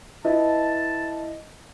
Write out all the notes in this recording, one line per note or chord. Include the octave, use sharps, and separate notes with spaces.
E4 B4 D#5 A5